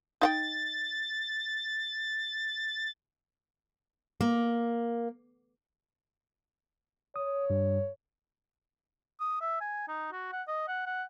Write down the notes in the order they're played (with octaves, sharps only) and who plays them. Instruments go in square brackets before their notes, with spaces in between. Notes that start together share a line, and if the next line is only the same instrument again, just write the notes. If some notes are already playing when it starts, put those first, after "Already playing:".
[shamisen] D#4 F#5 G5 [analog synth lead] A6
[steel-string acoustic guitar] A#3
[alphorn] C#5 [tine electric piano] D#6
[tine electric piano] G2 G3
[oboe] D#6
E5
G#5
D#4
F#4
F#5
D#5
F#5
F#5